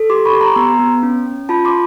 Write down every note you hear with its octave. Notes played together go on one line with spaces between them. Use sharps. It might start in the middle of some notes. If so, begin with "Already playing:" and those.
Already playing: A4
G4 C6 D6
B5 C#6
G4
A#5 C6
B3 A#5 C6
B3
C#4
C#4
F4 A5 B5
C6 D6